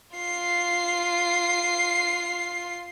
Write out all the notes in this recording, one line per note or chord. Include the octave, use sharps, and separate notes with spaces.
F4 C7